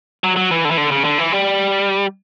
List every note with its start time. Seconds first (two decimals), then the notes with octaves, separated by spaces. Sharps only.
0.24 F#3
0.36 F#3
0.51 E3
0.65 D3
0.71 E3
0.77 D3
0.91 C#3
1.04 D3
1.18 E3
1.32 G3